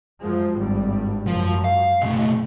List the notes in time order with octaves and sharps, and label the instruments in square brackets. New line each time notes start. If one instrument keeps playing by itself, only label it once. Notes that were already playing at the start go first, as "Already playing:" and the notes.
[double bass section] F#2 F3 G#3
G#1 G2 G3
[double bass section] F#2 [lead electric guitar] F3
[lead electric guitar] F5
[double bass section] F#1 [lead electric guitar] B1 A3